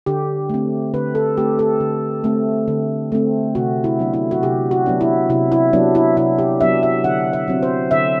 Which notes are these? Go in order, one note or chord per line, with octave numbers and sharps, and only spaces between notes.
D3 G4
A3 C4
D3 B4
A4
A3 C4 G4
A4
D3
A3 C4
D3
A3 C4
C3 F#4
E4
F#3 B3 D4
E4
F#4
C3 G4
F#4
F#3 B3 D4
E4
C3 E4
E4
F#3 B3 D4
E4
C3 E4
G4
F#3 B3 D4 E5
E5
D3 F#5
E5
F#3 C4
C5
D3 E5